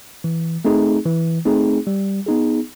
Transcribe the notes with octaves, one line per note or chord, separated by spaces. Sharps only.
E3
A3 C4 D#4 G#4
E3
A3 C4 D#4 G#4
G3
B3 D#4 G#4